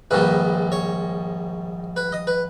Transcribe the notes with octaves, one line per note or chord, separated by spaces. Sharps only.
A#1 G#2 D#3 G3 B4
C#5
B4
D#5
B4